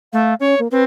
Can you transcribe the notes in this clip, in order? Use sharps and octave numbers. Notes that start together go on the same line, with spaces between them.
A3 F5
C#4 C#5
A#3
C4 B4